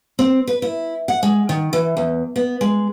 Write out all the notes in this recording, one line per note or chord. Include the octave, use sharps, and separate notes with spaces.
C4
B4
E4
F#5
G#3
D#3
E3
E2
B3
G#3